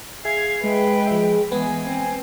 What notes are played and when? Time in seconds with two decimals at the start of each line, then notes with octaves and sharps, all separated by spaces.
0.25 G#4 E5 F5 G#6
0.64 G#3 B4 G5
1.07 F3 E5
1.51 E3 G#3 B3 B4 G#5
1.85 C4